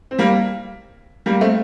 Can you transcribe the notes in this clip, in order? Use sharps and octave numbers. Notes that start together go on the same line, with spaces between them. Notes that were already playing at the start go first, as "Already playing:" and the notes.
C4
G3 A#3
G3 A#3
A3 C4